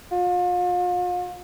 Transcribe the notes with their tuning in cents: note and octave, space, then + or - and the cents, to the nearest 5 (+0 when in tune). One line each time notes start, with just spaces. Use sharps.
F4 +40